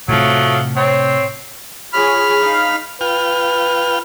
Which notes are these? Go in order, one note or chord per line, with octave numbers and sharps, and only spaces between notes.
A2 C3 F3 F#3 A3
C4 C5 C#5
F4 G#4 C#5 B5 F6
D#4 F5
F4 B4 G5 F6